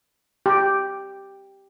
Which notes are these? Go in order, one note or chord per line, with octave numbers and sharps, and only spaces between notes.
G4